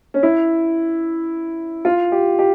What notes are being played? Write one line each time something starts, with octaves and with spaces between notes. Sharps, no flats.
C#4
E4
F4
G4
G4